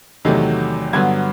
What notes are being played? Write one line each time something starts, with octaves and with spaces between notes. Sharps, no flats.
E2 C3 D#3 F#3 A3
G2 D3 F#3 B3 G#6